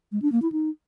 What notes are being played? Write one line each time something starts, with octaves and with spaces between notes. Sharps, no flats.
G#3
D4
A#3
E4
D#4